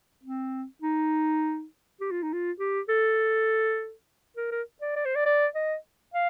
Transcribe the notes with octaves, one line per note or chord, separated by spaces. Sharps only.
C4
D#4
G4
F4
D#4
F4
G4
A4
A#4
A#4
D5
D5
C5
D5
D5
D#5
F5